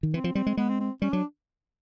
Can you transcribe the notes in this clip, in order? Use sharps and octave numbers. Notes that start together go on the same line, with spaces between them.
D#3
E3 C4
F3
G3 C4
G#3
G#3 B3
C4
C4
G3 C#4
F#3 D4